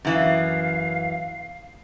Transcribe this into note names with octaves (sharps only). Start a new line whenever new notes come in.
F#2 E3 F5